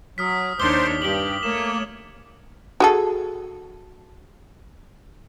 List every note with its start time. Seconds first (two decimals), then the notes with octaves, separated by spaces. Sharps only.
0.18 F#3 D#6 F6 B6
0.59 D#2 D4 C5 C#5 C6 D6 G7
1.02 G2 G4 F#7 G7
1.43 A3 A#3 C#5 E7
2.80 F#4 G#4 A4